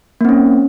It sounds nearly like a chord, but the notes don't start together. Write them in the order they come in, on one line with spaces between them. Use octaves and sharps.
A#3 C4 C#4